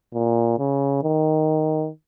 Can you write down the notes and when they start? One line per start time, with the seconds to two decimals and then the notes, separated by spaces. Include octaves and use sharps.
0.14 A#2
0.59 C#3
1.03 D#3